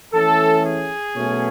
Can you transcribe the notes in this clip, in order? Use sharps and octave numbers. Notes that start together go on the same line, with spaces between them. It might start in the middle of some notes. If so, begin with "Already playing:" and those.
E3 A3 C#4 A4
G#4
B2 F#3 A3 C#4